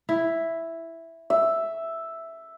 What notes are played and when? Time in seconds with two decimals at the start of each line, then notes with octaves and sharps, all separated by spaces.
0.09 E4
1.30 E5